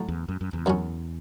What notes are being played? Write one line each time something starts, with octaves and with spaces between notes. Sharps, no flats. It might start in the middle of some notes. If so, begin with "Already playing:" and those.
Already playing: A2 F#3 A3
E2
F#2
F#2
E2
F#2 F#3 C#4